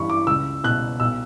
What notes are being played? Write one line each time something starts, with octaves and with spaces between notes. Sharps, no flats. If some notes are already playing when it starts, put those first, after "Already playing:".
Already playing: A1 G2 E3 B5 C#6
D6
C#2 E6
B2 F#6
B1 E6